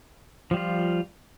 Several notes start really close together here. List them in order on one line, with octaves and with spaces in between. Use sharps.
F3 G3 F4